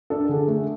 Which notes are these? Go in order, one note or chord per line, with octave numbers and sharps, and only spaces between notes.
D4 A4
D3 G#4
A3